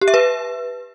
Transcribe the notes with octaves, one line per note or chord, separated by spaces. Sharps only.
G4
E5
B4